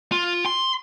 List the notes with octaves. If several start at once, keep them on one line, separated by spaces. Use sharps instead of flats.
F4
C6